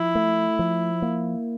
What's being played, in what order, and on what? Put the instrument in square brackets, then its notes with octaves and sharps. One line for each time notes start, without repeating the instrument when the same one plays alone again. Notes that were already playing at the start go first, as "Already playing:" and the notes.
Already playing: [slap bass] F3 [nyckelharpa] E4
[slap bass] A3
F3
A#3